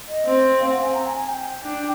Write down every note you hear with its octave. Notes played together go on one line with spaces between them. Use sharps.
D#5
C4
F5
F#5
G#5
A#5
G#5
G#5
G5
D4